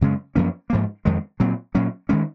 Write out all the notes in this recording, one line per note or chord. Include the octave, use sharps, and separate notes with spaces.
F#2 C#3 G#3 C#4
F#2 F3 A#3 C#4
G#2 F3 A#3
F2 D#3 G#3
A#2 F#3 C4
A#2 F#3 C#4
D#3 G#3 C#4